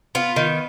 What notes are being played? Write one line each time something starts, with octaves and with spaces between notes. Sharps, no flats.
B3 F4
D#3